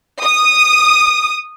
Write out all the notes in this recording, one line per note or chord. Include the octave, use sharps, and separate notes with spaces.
D#6